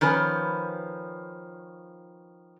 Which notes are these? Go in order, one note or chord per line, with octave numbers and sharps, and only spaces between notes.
D#3 F3 C#4 B4